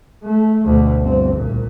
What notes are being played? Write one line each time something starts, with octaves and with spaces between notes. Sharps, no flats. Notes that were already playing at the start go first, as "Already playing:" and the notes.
A3
D2 B2
G1 C4
C2 A#2